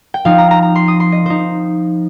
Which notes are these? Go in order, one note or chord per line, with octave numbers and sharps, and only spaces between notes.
G5
F3 C4 D#4 F5
A#5
A#5
A#5
C6
D#6
C6
D#5
F3 D#4 C5